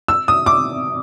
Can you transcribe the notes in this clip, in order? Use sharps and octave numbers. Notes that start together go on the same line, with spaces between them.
E6
D#6
D6